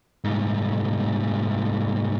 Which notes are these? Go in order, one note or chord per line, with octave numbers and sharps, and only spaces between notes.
C2 G#2